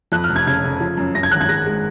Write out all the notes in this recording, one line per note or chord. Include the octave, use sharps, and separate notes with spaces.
F2 F#6
F6
F1
G#6
C#3 G#6
C#3
F3
F#2
F#2 A#6
G#6
G#1 F#6
G#6
G#3 A#6
G#3